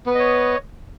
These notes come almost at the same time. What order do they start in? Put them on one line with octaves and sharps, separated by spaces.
B3 B4 D#5 C#5